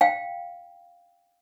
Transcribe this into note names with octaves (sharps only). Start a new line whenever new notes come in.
F5 G5